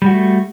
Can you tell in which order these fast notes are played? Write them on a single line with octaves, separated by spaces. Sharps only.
G3 F#4 A3